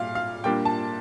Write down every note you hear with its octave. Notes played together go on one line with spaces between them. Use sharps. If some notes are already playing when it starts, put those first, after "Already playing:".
Already playing: A#2 G3 F5
F5
A#2 G3 A#3 D4 G5
A5